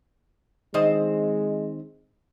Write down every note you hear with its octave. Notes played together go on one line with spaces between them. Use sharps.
D#3 G#3 C4 D#5